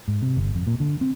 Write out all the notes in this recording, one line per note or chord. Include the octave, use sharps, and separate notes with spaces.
G#2
C3
G1
F2
A#2
D3
C4